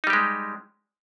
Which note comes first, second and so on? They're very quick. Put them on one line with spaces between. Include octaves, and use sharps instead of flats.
D#4 G3 G4 G#3